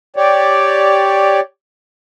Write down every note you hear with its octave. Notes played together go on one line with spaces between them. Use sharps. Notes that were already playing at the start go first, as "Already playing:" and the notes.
G4 C#5 D5